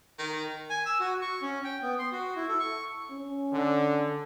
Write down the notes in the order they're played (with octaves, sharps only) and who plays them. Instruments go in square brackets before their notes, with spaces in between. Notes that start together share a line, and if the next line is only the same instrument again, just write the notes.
[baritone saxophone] D#3
[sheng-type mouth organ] G#5
E6
F#4
C#6
C#4
G5
B3
C6
F#4
E4
A4
C#6
[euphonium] C#4
[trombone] D3